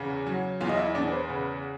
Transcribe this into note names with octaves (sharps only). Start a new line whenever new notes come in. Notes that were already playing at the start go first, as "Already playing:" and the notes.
Already playing: E2 C#3
F#3
E2 F4 F5
D#5
E4 E5
E2 D4 D5
B4
C5
C#3 B4